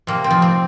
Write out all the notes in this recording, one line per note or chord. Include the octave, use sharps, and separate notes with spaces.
C3 A#3
C4
F3
C4